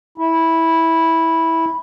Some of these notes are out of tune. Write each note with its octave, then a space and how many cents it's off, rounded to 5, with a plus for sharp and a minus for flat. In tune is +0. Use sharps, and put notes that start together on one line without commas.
E4 -10